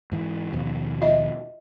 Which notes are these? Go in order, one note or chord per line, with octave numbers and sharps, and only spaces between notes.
G#2 E3
D#2 B2 F3
F4 D#5 E5